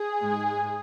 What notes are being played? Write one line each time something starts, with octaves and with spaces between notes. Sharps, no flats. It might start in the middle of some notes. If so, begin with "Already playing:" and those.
Already playing: G#4
G#2 G#3